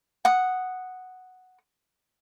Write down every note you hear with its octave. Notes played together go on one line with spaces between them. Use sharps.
F#5 D#6